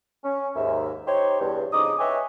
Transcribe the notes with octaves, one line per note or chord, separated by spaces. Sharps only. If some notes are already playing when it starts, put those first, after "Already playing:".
C#4
D#2 G#2 E5
D#4 G4 C5 C#5
E2 G2
F2 C#3 D#4 D6 D#6
B4 C#5 D#5 E5 G5 G#5